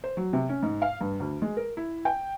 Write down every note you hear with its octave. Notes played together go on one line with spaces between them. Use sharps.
C5
F#3
C3
C#4
G#2
F5
G2
D2
G#3
A#4
E4
G5